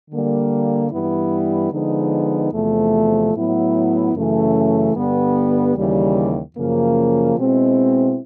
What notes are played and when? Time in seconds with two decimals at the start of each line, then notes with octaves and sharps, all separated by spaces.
0.11 D3 G3 A#3
0.90 G2 E3 G3 B3 E4
1.71 D3 F3 G#3 B3 D#4
2.52 E2 C3 F3 A3
3.34 A2 F#3 B3 E4
4.14 F#2 C#3 E3 A3 C#4
4.94 G2 D3 G3 B3
5.75 D#2 C#3 E3 G3
6.56 F#2 C#3 F3 A#3
7.37 B2 G#3 C4 E4